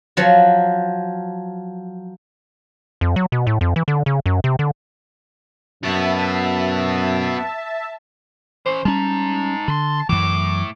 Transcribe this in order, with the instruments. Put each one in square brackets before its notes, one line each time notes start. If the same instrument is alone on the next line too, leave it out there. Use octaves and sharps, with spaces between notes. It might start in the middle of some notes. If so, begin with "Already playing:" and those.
[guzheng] F3 F#3
[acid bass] F2
F#3
B2
A2
F2
E3
D3
C#3
F#2
C3
D3
[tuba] F#2 [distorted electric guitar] B3 F#4 [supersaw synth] E5 A5
[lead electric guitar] E3 C#4 [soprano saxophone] C5
[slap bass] G3 C#4 [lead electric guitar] G#3 D#4 [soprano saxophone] A5
[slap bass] D3 [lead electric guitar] B5 C6
[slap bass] F#2 E3 [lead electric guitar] A2 [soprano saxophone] D6